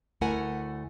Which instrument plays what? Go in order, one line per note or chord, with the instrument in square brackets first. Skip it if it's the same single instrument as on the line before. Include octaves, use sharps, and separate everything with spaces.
[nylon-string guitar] D2 A3 E4 A#4 F#5 G#5